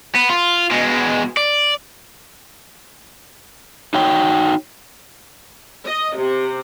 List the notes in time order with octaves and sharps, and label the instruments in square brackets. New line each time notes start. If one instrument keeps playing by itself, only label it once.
[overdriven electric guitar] B3
F4
B2 G#3
D5
[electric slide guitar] D#4 F#4 C#5 G5
[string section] D#5
C3